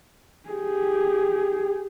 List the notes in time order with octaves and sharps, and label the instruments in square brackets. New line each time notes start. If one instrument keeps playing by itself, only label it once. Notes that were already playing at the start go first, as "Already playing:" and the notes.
[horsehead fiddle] G4 G#4